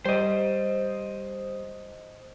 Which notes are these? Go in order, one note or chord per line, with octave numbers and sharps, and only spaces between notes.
G3 C5 D#5